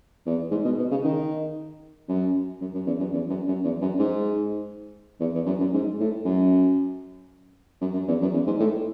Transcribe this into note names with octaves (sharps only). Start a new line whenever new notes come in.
E2
G#2
B2
B2
C#3
D#3
F#2
F#2
F#2
E2
F#2
E2
F#2
F#2
E2
F#2
G#2
E2
E2
F#2
F#2
G#2
A2
F#2
F#2
F#2
E2
F#2
E2
G#2
A2